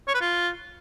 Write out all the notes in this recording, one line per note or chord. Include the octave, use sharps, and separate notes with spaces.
C#5
B4
F4